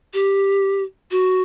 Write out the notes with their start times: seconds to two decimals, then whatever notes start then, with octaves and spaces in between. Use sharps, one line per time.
0.14 G4
1.11 F#4